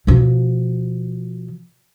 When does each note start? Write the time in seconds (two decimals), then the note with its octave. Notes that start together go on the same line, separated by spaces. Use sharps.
0.07 B2 F3